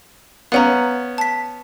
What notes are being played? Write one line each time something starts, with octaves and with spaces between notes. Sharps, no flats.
B3 C#4 F5 F#5 A#5
A5 B6